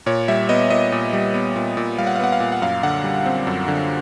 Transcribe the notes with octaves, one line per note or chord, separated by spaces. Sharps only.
A#2 C#5
G3 E5
B3 D#5
A#2 D#5
A#2
G3
B3
A#2
A#2
G3 F5
F#5
F5
B3 F#5
F5
A#2
F#5
F#2 F5
D3 F#5
G3
C4
F#2
D3